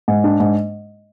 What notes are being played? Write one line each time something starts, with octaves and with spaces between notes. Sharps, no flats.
G#2
D4
G#2